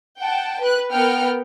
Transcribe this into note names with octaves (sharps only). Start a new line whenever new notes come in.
F#5 G5 A5
B4 F#6
B3 A#4 F#5 G5 F6